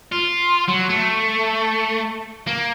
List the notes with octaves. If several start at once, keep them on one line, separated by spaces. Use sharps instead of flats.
F4
F#3
A3
A#3